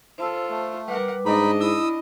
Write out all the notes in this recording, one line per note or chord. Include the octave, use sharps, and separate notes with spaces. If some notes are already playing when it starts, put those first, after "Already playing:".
F4 A4 C5 A5 E6
A3
G3 A#4 B4 F#5 D6
G#2 D4 D#4 D#5 B5
E4 B5 D#6 E6